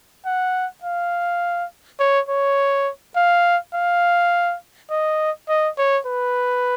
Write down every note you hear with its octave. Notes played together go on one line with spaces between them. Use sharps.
F#5
F5
C#5
C#5
F5
F5
D#5
D#5
C#5
B4